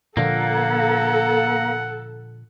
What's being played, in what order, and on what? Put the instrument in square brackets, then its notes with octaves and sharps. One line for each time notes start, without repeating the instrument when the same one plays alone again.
[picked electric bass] A#2 D3 F3 [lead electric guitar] A#3 [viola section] A4 [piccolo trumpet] F#5